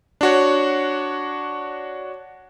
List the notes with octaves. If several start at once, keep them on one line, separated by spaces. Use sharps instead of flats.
D4 F#4 C#5